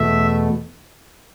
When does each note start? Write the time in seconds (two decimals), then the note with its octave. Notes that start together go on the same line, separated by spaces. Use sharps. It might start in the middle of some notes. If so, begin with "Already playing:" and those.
Already playing: E2 B2 A3 E5